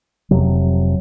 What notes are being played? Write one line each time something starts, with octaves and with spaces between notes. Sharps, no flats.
F1 F2 C3 F#3